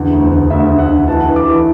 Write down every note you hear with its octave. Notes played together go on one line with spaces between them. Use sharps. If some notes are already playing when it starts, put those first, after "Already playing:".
Already playing: E2 D3
D2
D3
D2 E5
D3
F#5
D3
E3 A5
E3
D6
E3